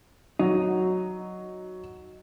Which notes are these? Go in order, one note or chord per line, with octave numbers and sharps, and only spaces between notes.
F#3 D#4